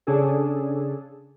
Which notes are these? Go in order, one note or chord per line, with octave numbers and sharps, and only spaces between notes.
C#3 D4 G#4 A4